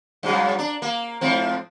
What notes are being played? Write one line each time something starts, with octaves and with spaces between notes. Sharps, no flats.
G2 C#3 F#3
D4
A#3
G#2 F3 C4